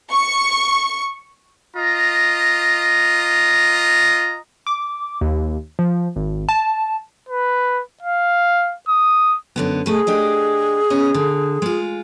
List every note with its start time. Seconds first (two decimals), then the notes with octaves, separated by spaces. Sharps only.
0.11 C#6
1.76 F4 D#5 A#5
4.67 D6
5.21 D#2
5.79 F3
6.16 G#1
6.49 A5
7.29 B4
8.03 F5
8.89 D#6
9.56 F#2 D3 B3
9.86 B2 A3 G#4 B4
10.07 D4 G4 D#5
10.90 B3 C#4 D#5
11.14 D3
11.62 G#3 F4